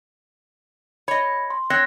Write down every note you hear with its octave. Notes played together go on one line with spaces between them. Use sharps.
C#5 D#5 B5
C6
C4 C#5 F#6 A#6